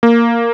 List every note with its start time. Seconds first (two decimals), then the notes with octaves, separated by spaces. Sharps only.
0.03 A#3